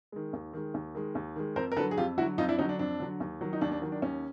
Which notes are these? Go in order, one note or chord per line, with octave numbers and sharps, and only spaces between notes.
D#3 G#3
D#2
D#3 G#3
D#2
D#3 G#3
D#2
D#3 G#3
F2 A#4 C5
A#4
D3 F#3 A4 B4
G#4
F2 F4 G4
D3 F#3 E4 F#4
F2 D#4 F4
D4 E4
D3 F#3 C#4 D#4
D4
F2 D4
D3 F#3
D#2
D#3 F#3
D#4
D#2 D4
D4
D#3 F#3
D4
D#2 C#4